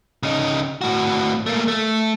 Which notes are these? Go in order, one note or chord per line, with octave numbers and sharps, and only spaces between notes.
C#3 D#4
A2 F#4
A3 A#3
A3